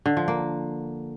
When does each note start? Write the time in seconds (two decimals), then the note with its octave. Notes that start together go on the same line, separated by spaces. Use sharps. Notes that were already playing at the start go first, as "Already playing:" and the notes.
0.06 D3
0.17 F3
0.28 A#3